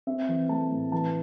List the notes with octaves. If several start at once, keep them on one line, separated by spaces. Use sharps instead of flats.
C4 E5
E3
A3 A5
A2
E3 A5